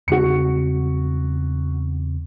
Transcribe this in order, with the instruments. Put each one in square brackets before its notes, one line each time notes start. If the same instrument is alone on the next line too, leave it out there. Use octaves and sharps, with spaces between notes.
[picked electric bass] E2 C#3 C4 [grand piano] F#4 C#7